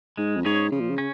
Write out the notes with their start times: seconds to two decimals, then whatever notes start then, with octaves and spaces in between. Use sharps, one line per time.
0.17 G#2 G#3
0.36 F2
0.45 G#2 C#4 G#4 C#5
0.72 C#3 F3
0.80 A#2
0.90 C#3
0.98 C#4